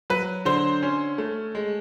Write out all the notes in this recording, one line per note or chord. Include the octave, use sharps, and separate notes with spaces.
F#3 B4
D3 C5
C#4
A3
G#3